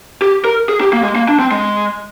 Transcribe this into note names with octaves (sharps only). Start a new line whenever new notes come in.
G4
A#4
G#4
G4
A#3
G#3
A#3
D4
C4
G#3